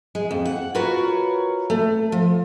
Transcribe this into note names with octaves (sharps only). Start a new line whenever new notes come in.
G#3
F2
F#5
F4 F#4 A#4 B4 C#5
A3
F3